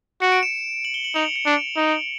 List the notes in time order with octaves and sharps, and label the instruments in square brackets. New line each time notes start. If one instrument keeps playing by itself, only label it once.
[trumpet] F#4 [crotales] C#7
[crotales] D7
E7
F#7
G7
F#7
[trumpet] D#4 [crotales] F7
[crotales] C#7
C#7
[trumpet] D4 [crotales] D7
[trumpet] D#4